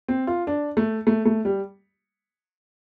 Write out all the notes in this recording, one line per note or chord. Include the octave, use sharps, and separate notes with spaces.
C4
F4
D4
A3
A3
A3
G3